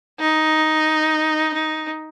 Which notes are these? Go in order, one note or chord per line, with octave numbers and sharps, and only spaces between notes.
D#4
D#4